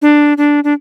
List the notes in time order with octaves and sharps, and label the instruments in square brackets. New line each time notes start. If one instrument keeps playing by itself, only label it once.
[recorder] D4
D4
D4